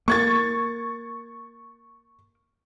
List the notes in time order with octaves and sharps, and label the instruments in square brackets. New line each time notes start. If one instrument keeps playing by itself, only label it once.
[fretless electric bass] A#3 [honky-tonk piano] C#6 G#6 A6